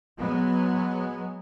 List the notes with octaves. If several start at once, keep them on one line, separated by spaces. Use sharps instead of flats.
F#3 G#3 B3